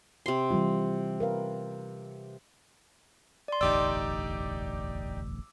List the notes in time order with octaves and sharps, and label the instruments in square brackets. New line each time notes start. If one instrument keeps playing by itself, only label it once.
[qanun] C3 C6
[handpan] E3 G3 F4
A#4 B4 F5
[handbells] D5 C6
[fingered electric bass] E1 A1 D2 [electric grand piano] D#4 G4 D5 [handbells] D6 E6